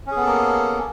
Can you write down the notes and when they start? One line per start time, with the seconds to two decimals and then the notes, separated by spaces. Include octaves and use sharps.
0.07 C#4
0.12 G#4
0.17 B3
0.21 A4
0.26 A#3